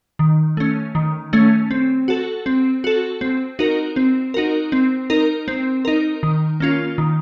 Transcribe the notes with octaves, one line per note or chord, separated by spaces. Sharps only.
D#3
A3 C#4
D#3
A3 C#4
C4
F#4 A4
C4
F#4 A4
C4
D#4 F#4 A#4
C4
D#4 F#4 A#4
C4
D#4 A#4
C4
D#4 A#4
D#3
A#3 C#4 F4
D#3